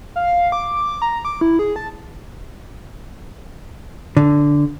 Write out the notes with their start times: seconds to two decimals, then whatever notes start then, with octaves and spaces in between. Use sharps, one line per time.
0.16 F5
0.52 D6
1.02 A#5
1.25 D6
1.41 E4
1.59 G#4
1.76 A5
4.17 D3